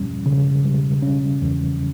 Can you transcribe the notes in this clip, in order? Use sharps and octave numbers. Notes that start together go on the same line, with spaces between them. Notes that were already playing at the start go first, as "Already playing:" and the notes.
Already playing: E2 G3 C#4
C#3
G3
C#4
E2